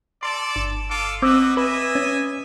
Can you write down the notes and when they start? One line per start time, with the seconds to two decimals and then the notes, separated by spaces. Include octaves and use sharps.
0.23 A4 D5 C6
0.56 G1 E7
0.90 F4 A4 D6
1.22 C4 F#4 B4 D#5 D6 E6
1.57 B4 D#5 E5 G#5
1.95 C#4